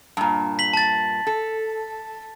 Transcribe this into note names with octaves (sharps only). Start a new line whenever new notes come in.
G2 A#2
B6 F#7
A5 A6
A4